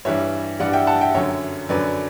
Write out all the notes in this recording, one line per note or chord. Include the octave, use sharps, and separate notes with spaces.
G2 E3 G3 C#5 E5
G2 E3 G3 D5 F#5
E5 G5
F#5 A5
E5 G5
F#2 D3 F#3 C#5 E5
F#2 D3 F#3 B4 D5